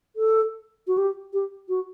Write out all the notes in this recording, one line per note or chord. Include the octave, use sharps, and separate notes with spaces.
A4
F#4
G4
G4
F#4